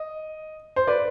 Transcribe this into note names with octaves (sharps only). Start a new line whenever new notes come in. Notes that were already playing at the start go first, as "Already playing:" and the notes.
Already playing: D#5
C5
B4 D5